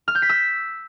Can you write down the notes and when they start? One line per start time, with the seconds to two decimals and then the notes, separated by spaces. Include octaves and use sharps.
0.08 F6
0.15 G6
0.22 B6
0.29 E6